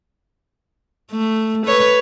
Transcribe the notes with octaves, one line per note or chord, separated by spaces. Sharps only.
A3
B4 C#5